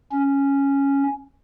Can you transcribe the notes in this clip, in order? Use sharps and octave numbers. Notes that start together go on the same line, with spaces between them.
C#4